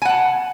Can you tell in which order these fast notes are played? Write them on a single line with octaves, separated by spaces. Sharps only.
G#5 F#5 A5